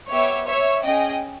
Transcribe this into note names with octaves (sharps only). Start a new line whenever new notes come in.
B3 G4 C#5 E5
C#5 E5
C#4 G#4 D#5 G5